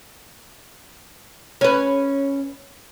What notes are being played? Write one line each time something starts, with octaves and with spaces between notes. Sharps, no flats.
C#4 B4